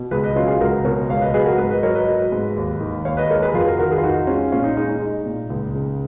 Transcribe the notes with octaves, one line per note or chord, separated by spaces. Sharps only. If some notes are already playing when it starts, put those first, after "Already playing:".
Already playing: B2
C#2 G#4 B4
B4 D#5
F#3 C#4 F4
F4 G#4
C#2 F#4 A#4
B2 A#4 C#5
C#2 C#5 F5
B4 D#5
F#3 G#4 B4
F#4 A#4
G#2 G#4 B4
B4 D#5
F#3 A#4 C#5
B4 D#5
F#3
G#2
D#2
D#3
D#2 C#5 F5
B4 D#5
G#3 A#4 C#5
G#4 B4
F2 F4 G#4
F#4 A#4
D#3 F#4 A#4
G#4 B4
F4
F2 D#4 F#4
G#3 C#4 F4
A#2 C#4 F4
D#4
G#3 D#4
D#4
G#3 D#4
A#2
C#2
C#3